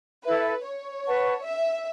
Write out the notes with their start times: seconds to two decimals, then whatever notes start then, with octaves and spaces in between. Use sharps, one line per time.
0.23 E4 A4 B4 E5 B5
0.63 C#5
1.04 B4 F#5 A5 C#6
1.45 E5